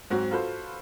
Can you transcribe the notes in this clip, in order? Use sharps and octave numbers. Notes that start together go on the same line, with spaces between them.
G#2 F#3 C4 F#4
F4 F#4 A4 B4 C5